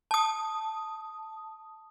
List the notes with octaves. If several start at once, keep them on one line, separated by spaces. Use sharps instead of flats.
A5 D#6